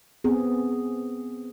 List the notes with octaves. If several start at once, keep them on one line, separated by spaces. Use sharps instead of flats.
B3 C4 G#4